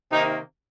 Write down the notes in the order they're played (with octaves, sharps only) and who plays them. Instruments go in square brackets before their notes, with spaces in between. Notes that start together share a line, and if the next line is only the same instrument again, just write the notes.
[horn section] C3 D#3 A#3 D#4